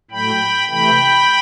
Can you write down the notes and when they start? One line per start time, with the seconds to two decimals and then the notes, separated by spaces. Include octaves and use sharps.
0.10 A2 F#3 A3 G5 B5
0.69 C3 E3 A3 G5 B5